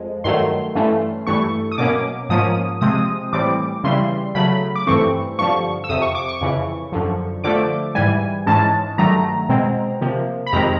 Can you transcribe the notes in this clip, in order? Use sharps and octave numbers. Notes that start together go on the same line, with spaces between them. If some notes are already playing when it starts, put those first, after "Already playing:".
Already playing: F2 F3 G#3
G2 D#3 F#3 A3 C6
G2 E3 A3 C#4
G2 E3 A3 C#6
D#6
B2 F#3 A#3 C#4 D6
G#2 F3 A#3 C#4 D#6
C3 F3 G#3 C4 D#6
A2 E3 G3 C4 D6
C#3 E3 G3 C6
C#3 F#3 A3 B5
D6
G2 E3 A3 C4 C#6
G2 D3 F3 C#6
E6
F2 C3 F3 D#6
C#6
D6
C#6
F2 C#3 E3
F#2 D3 F3
D3 F3 A3 D6
G#2 E3 G3 G#5
G#2 E3 G#3 C#4 A5
G2 D#3 F#3 A3 A#5
B2 G#3 C4
C3 F3 A#3
B5
F2 C3 D#3 G#3 C4 A#5